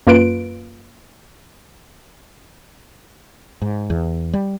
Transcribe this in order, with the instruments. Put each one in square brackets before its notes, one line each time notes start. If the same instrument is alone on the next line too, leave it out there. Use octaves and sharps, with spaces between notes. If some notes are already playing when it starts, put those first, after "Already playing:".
[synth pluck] F#2 A#3 F4 B4 D7
[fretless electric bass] G#2
E2
G3